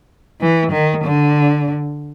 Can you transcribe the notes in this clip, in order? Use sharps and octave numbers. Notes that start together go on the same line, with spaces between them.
E3
D#3
D3